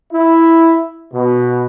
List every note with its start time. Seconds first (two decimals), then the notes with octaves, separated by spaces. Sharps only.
0.13 E4
1.14 B2